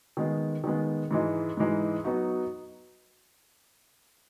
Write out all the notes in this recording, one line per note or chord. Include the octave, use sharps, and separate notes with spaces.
D#3 G#3 B3
D#3 G#3 B3
G#2 E3 G#3 D#4
G#2 E3 G#3 D#4
F#3 B3 D#4 F#4